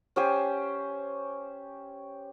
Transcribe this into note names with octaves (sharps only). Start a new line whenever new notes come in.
C#4 G4 C5 G#5